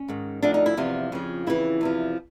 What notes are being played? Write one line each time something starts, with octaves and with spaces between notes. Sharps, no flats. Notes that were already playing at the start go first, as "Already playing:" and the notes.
Already playing: C#4
G#2 D#3
D2 D3 F3 D4
D#4
E4
E2 C3 F3 F4
F2 C#3 F3
F2 C#3 E3 E4
E2 C3 F3